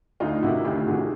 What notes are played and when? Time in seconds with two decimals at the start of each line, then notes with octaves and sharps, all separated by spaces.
0.20 D2 D#4 F4
0.43 C3 D#3 E4 F#4
0.65 D2 F4 G4
0.87 C3 D#3 F#4 G#4